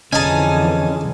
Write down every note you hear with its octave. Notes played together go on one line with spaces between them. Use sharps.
F2 D3 E3 C#4 D#4 G#4 G#5 A5